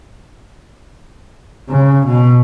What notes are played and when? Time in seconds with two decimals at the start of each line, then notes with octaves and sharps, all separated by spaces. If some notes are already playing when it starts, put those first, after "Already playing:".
1.69 C#3
2.07 B2